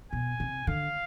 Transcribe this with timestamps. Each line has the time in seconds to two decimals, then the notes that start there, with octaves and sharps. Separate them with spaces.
0.12 B2 G#5
0.40 C3
0.67 D3 F5